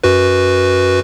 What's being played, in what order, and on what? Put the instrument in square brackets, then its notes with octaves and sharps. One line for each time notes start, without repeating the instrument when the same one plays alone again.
[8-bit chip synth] F#2 F#4 B4